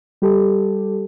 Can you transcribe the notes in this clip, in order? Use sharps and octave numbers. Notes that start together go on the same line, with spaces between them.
G3 G4 A4